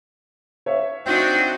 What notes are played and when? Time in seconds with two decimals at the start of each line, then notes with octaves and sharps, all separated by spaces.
0.66 C#5 E5 F5
1.06 C4 D4 D#4 F#4